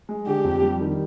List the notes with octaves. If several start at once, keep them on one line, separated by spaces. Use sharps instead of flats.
G#3
D3 G4
F2
G3
D#3